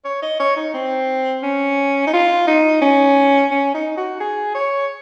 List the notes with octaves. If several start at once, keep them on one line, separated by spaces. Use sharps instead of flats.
C#5
D#5
C#5
D#4
C4
C#4
D#4
F4
D#4
C#4
C#4
D#4
F#4
G#4
C#5